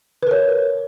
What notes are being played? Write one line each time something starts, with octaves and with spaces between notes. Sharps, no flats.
A#4 B4 C#5